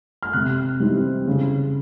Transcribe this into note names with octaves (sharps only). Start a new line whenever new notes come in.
F6
C3 F#6
E3 G3 C4 D#4
C#3